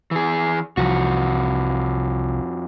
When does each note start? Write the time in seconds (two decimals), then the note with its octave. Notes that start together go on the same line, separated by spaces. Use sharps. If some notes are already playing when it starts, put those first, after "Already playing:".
0.11 E3 G#4
0.77 C2 F2 E3 F3 F#4